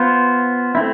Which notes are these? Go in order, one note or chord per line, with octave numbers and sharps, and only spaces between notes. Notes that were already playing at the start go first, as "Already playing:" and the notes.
Already playing: B3 F4 C5
A3 C4 E4